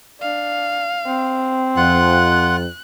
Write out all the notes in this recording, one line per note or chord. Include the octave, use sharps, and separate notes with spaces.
D4 F5
C4
F2 F4 F#5 F#6